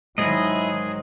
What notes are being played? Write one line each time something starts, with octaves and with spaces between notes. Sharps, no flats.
G#2 D#3 F#3 E4 G#4 D#5